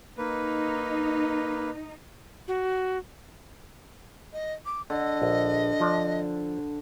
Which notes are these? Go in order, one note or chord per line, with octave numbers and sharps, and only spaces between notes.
A#3 D#4 B4
F#4
D#5
D6
D3 D#5
A#1
F3 D4